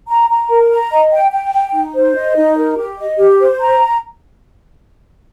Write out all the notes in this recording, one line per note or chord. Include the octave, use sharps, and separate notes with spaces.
A#5
A#5
A#4
A#5
D#5
G5
G5
G5
D#4
C5
D#5
D#4
A#4
G4
D#5
G4
C5
A#5